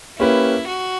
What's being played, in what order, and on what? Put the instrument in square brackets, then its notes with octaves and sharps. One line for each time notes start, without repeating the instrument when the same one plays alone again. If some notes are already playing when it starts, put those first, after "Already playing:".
[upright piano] A#3 C#4 G4 B4 [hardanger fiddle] E4
[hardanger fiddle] F#4